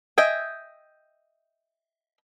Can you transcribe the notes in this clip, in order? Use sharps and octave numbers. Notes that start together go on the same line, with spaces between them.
D#5 E5 G5 G#5